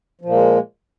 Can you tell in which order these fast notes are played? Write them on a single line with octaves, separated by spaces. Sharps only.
F3 A#2 A#3 G#3